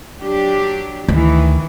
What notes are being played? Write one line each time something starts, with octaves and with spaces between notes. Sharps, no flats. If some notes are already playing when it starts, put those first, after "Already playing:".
F#3 D4 G4
D2 D#3 E3